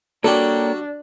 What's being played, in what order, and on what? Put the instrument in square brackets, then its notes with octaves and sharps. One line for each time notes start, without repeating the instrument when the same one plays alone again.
[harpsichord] G3 F#4 G4 [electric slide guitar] A#3 C#5 G5 [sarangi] D4 [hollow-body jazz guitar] A4